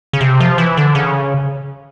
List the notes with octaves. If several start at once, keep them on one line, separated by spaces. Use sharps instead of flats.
C#3
C3
F3
E3
D3
C#3